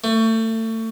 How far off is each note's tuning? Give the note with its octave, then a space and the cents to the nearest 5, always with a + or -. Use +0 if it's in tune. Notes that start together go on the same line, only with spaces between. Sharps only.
A3 +30